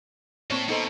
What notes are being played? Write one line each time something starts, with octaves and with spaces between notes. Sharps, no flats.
A2 A#3 C4 A4 C#5
B2 D#4 A4 C5